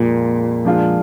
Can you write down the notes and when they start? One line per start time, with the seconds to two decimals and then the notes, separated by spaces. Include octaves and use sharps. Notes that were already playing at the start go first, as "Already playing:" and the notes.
Already playing: F2 A#2 G#3
0.65 F3 G#3 D4 F4